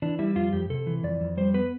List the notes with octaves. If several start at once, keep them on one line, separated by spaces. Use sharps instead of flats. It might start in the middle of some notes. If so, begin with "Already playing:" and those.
E3 D4
G3 E4
F2 F4
F2 G4
C3 A4
E3
F2 D5
F2
G3 C5
B3 B4